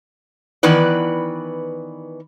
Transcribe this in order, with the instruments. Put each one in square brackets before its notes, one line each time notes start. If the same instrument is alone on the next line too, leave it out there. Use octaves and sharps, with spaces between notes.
[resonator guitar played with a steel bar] D#3 E3 B3 B4 D5